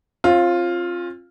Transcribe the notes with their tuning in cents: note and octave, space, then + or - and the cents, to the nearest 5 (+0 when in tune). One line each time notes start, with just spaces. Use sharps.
C4 +45 F4 +0